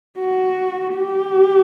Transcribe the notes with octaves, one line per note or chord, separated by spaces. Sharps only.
F#4
G4